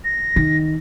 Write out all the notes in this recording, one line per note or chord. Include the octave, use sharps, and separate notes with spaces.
A#6
D#3